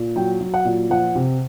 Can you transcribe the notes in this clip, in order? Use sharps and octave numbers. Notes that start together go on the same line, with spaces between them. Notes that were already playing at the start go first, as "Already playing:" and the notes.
Already playing: A#2
F#3 G5
F#3
F#5
A#2
F3 F#5
C3